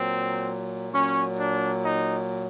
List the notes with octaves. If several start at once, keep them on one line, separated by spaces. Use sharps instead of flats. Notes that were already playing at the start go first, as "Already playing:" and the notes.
Already playing: A#2 F#3 C4
A#2 F#3 C#4
D4
D#4